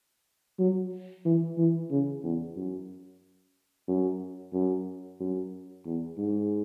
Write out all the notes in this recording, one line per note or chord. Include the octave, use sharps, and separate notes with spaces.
F#3
E3
E3
C#3
E2
F#2
F#2
F#2
F#2
E2
G#2